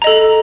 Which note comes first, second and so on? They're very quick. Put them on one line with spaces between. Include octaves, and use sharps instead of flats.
A#5 D#5 A4